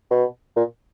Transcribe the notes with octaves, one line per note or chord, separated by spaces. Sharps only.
B2
A#2